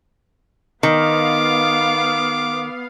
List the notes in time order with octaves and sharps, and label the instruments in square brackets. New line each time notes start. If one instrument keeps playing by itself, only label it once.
[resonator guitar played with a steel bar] D#3 [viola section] B3 F5 [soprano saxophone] D6